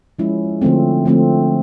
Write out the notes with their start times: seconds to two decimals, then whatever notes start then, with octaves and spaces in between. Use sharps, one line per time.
0.19 F3 G#3 C#4 E4
0.62 D3 F3 A3 C4
1.06 D3 F3 A3 C4